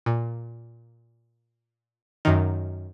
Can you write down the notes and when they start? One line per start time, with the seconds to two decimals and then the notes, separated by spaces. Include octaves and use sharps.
0.06 A#2
2.25 F#2 D#3